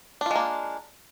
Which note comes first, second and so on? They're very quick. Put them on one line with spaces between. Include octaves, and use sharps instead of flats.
D4 F4 G#3 A#3